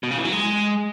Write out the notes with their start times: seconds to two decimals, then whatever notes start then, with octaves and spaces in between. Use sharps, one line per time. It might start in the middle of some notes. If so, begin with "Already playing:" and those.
0.03 B2
0.11 C#3
0.18 E3
0.25 F#3
0.32 G#3